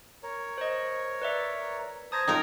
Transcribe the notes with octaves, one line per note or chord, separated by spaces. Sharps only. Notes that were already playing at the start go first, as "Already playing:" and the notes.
A#4 C#5
C5 D#5
B4 D5 E5
C5 A5 A#5 D#6 G#6 A#6
D#4 F4 A#4 G5